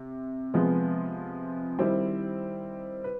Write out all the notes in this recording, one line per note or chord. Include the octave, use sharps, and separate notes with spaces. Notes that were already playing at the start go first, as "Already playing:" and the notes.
Already playing: C3
C3 F3 G#3 B3
D#3 G3 C4 E4
B4